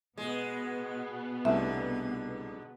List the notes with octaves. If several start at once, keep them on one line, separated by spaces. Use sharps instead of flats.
B2 G#3 B3
C2 G#2 D3 A3 E5